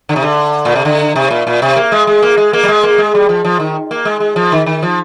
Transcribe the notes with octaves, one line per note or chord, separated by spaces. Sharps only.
D3
C3
D3
A#2
C3
D3
C3
A#2
A#2
C3
A#3
G#3
G#3
A#3
G#3
A#3
G3
G#3
A#3
G#3
G3
F3
F3
D#3
A#3
G#3
G#3
F3
D#3
D#3
F3